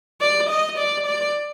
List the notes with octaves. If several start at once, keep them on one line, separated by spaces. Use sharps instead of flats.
D5
D#5
D5
D5